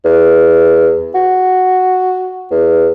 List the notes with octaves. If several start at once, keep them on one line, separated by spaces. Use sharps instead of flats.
E2
F#4
E2